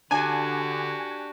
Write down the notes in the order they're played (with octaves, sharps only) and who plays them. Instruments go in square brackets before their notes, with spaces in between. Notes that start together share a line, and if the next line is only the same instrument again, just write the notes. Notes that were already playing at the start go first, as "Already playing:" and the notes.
[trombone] D3 [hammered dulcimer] D4 [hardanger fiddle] F#4 G4 [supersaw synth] G#5